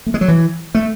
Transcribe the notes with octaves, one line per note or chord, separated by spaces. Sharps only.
A3
G#3
F#3
E3
A3